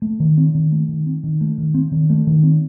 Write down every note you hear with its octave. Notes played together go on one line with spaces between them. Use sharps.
A3
D#3
C4
D#3
A3
D#3
C4
D#3
A3
D#3
C4
D#3
A3
D#3
C4